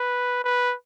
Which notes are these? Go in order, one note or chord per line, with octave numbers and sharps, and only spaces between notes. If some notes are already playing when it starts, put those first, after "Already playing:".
Already playing: B4
B4